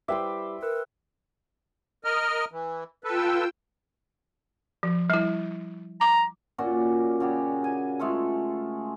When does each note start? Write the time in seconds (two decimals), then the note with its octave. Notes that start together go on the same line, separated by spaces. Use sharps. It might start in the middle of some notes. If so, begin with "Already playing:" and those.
0.08 G3 E4 B4 E5 G5 C6 D6
0.62 A#4 B4 E6
2.04 A#4 D#5 F6
2.52 E3
3.04 F4 A4 B4 G5 E6
4.83 F3
5.10 G3 E4
6.01 A#5 D6
6.58 A#2 C#4 F#4 D5
7.20 C#3 F#4 G4
7.64 G#5
7.99 G#3 A3 F4 A4